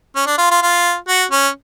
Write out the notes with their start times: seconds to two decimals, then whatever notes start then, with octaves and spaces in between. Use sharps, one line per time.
0.16 C#4
0.27 D4
0.38 F4
0.51 F4
0.63 F4
1.08 F#4
1.32 C#4